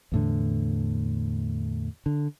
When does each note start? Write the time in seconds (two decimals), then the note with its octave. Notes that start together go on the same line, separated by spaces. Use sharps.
0.12 E2 A2 D3
2.06 D3